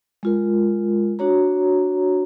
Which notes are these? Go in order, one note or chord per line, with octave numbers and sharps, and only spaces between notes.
G#3 F4 A#4
D4 F#4 C#5 A#5